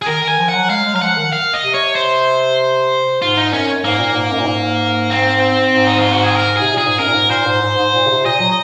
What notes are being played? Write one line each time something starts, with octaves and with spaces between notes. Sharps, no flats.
G#4
D#3 A#4
D#3
G#5
F3
F#5
F#3
G#3 F5
G#3
F#3 F5
F3 F#5
D#3
F5
D#5
C3
C#5
C5
G#2 F4
D#4
F#2 C#4
G#2 A#3
A#2
A#2
G#2
F#2
A#2
G#2
C4
G#2
D#4
F4
F#4
G#4
A#4
C3 G#4
A#2 G#4
G#2
F#2 A#4
A#2
G#2
A#2 C5
G#2
G#2
G#2
A#2
C#3
C3
A#2 D#5
F#3